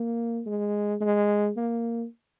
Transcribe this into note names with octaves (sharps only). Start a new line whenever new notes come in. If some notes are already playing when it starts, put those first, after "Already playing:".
Already playing: A#3
G#3
G#3
A#3